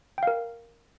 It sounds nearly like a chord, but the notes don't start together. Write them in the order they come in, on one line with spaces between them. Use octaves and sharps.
G5 F5 A#4